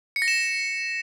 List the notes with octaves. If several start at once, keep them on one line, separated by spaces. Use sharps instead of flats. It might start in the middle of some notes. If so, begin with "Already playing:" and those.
C#7
A#6
E7